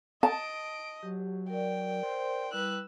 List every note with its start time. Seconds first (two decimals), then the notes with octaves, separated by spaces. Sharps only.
0.23 D#5 A5 D7
1.03 F#3 G4
1.50 A#4 D5 G5
2.03 C5
2.52 G3 E4 B4 E6 F#6